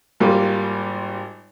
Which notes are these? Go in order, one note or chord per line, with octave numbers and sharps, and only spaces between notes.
G#1 G3 A#3 F4